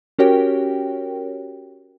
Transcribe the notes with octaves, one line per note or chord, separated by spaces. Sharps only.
C#4 F#4 G4 A#4 C#5 G5